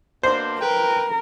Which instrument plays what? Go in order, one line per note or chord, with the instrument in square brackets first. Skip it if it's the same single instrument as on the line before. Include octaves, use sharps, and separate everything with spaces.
[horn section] B2 A#3 D4 [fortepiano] C5
[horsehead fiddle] A#4 [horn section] B4 G5